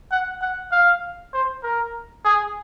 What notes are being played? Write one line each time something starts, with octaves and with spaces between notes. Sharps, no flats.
F#5
F#5
F5
C5
A#4
G#4